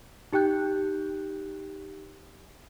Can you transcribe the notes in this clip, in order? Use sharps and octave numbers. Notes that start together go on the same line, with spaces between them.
D#4 G4 G5 F#6 G6